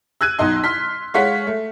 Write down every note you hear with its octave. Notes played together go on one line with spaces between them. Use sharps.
E6 F#6 G#6 D#7
B1 D#4 D#5 C6
C6 F6 B6
G#3 C#5 F5 F#5 B6
A3